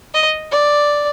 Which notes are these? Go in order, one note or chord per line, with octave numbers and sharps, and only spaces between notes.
D#5
D5